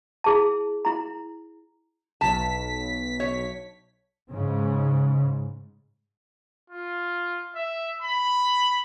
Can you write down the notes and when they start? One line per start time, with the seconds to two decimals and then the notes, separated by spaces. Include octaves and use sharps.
0.24 E4 G#4 A5
0.85 E4 A#5
2.21 B1 A5 B6
3.20 C#5
4.30 G#2 C#3
6.70 F4
7.55 E5
8.03 B5